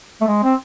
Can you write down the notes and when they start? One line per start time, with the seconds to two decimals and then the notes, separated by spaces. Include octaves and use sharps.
0.21 A3
0.28 G#3
0.43 C4